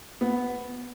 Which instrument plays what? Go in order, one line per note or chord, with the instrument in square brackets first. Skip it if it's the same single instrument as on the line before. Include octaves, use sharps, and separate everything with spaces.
[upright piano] B3